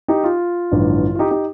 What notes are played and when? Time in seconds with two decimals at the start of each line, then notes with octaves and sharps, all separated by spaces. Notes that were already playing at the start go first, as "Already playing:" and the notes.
0.08 D#4 G4
0.24 F4
0.71 A1 G2 D3 F3
1.15 F4
1.19 D#4 G4
1.31 D#4 G4